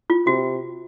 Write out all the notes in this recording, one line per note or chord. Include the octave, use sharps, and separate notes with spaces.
F4
C3 F#4